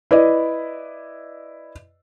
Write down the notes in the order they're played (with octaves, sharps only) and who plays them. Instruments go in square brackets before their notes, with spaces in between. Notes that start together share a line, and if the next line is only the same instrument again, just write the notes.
[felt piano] E4 B4 D5 D#5